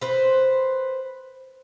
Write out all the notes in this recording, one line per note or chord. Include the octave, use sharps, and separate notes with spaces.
B4 C5